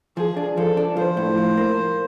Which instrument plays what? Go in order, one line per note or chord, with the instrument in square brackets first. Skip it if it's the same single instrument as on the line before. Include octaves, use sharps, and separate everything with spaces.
[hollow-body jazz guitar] F3 [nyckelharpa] G#4
[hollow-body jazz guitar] D4
[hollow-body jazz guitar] F3 [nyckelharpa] A4
[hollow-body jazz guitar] D4
[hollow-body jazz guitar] F3 [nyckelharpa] C5
[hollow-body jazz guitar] A2
F3
A#3